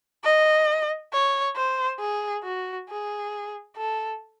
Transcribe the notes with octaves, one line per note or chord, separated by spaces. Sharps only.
D#5
C#5
C5
G#4
F#4
G#4
A4